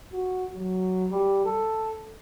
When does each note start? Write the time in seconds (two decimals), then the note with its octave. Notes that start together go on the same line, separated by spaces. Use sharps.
0.13 F#4
0.54 F#3
1.11 G3
1.45 A4